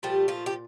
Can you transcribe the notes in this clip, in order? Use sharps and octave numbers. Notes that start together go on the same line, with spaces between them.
A#2 F3 G3 A3 G4
F3 F4
G4